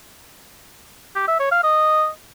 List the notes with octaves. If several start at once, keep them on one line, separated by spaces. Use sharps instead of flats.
G4
E5
C#5
F5
D#5